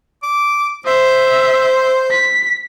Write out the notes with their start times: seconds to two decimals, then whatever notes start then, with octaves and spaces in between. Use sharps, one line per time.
0.23 D6
0.86 C5 E5
2.10 B6